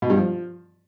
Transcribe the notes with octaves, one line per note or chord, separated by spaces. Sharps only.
B2
G2
F3